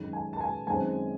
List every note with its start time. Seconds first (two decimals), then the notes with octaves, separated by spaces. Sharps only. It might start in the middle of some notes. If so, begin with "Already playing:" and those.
Already playing: F#2 D#3 G#3
0.13 G#5
0.33 A5
0.41 G#5
0.67 F#2 D#3 G#3 C4 G#5